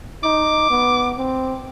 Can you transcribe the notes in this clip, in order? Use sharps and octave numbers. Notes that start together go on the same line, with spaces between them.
D#4 D6
B3
C4